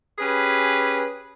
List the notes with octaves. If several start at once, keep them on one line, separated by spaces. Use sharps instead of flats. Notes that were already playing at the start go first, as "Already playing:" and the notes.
C#4 G4 G#4 B4